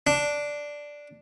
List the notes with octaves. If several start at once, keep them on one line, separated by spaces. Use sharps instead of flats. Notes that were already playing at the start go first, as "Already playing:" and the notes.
D4